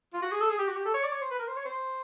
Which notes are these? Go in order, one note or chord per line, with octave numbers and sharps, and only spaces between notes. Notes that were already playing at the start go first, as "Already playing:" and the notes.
F4
F#4
G#4
A4
G#4
G4
F#4
G4
A4
C#5
D5
C#5
C5
B4
A#4
C5
C#5
C5